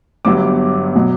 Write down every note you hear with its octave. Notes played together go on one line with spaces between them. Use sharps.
G1 G2 F#3 B3 D6
B2 F#3